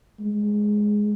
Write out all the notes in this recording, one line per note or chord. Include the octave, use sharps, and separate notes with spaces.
G#3